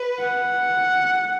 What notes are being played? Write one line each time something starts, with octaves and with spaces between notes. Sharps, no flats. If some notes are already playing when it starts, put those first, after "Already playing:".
Already playing: B4
F#5